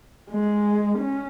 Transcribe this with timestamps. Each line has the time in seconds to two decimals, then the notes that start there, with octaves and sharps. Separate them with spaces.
0.30 G#3
0.98 C#4